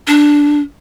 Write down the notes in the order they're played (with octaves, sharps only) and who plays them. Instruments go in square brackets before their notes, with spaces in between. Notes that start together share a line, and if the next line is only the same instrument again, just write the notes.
[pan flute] D4